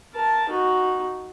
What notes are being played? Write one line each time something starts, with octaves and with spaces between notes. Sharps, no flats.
A#4 A5
D#4 F#4